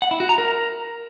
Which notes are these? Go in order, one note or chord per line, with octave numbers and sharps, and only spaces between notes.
F#5
E4
F#4
A#5
A#4